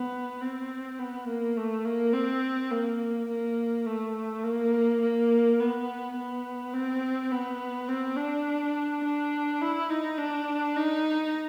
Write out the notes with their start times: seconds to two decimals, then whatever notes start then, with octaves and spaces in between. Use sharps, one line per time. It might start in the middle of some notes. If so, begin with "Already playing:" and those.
Already playing: B3
0.41 C4
0.99 B3
1.27 A#3
1.57 A3
1.85 A#3
2.13 C4
2.71 A#3
3.29 A#3
3.86 A3
4.44 A#3
5.01 A#3
5.59 B3
6.16 B3
6.74 C4
7.31 B3
7.88 C4
8.17 D4
9.04 D4
9.61 E4
9.90 D#4
10.18 D4
10.77 D#4